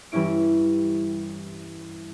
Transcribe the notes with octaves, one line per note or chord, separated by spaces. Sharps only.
G2 E3 G3 C#4 E4 D7